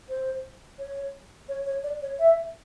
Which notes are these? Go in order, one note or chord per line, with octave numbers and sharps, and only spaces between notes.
C5
C#5
C#5
C#5
D5
C#5
E5